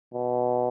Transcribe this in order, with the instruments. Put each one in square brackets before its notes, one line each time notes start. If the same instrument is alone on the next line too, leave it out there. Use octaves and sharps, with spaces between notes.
[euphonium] B2